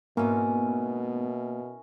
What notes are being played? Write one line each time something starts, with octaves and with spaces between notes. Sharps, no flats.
G#2 B2 A#3 B3 C#4 E4 A#4